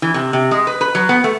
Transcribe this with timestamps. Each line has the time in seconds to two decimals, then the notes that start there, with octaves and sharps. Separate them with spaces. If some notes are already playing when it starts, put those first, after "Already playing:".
0.02 E3
0.14 C3
0.33 C3
0.51 G#3
0.67 B4
0.81 B4
0.95 F#3
1.09 B3
1.24 A3